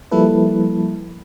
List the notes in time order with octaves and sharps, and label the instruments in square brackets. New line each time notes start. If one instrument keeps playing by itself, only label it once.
[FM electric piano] F3 G3 A#3 E4 A4 B4